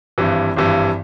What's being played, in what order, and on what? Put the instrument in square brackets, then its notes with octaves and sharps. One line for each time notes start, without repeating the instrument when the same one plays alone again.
[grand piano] G#1 G2 E3
G#1 G2 E3